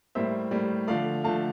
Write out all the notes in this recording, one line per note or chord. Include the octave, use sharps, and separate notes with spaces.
A2 G3 A#3 C5 E5
A2 G3 A#3
D3 F3 A3 D5 F5
D3 F3 A3 F5 A5